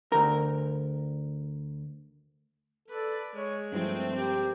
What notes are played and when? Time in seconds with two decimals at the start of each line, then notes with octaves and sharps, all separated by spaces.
0.12 D2 A#4
2.88 A4 B4 D5
3.34 G#3 G#4 C#5
3.72 G2 F3 A3 C4
4.16 G4 A#4